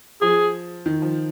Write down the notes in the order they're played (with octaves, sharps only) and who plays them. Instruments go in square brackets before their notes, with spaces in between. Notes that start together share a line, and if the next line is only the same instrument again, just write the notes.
[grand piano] F3 [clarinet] G#4
[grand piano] D#3
F3